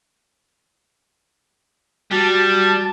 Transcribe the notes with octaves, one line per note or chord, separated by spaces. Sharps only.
G3 F#4 A5